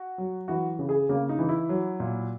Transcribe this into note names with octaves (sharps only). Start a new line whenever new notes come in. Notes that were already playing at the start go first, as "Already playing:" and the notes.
Already playing: F#4
F#3
E3 F#4
C#3
G#4
C#3 A#3
D#4
E3
E4
F#3
A#2